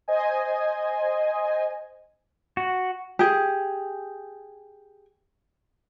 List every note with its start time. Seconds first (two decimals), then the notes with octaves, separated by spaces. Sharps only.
0.08 C5 D#5 G#5
2.57 F#4
3.19 G4 G#4